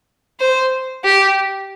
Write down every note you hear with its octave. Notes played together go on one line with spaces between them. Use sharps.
C5
G4